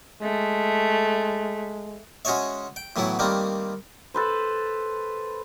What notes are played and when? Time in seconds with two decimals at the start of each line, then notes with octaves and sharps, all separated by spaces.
0.22 G#3 A3
2.25 G#3 C#4 F#4 G#4 C#5 E5
2.76 G5
2.96 A2 E3 F#3 B3 E4
3.19 D#3 G3 A3 A#3 C4
4.14 A4 B4 C5